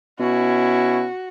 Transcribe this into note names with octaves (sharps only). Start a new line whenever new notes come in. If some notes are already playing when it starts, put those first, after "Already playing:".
B2 C#4 E4 F#4